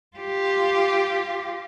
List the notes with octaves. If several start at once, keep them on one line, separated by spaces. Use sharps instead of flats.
F4 G4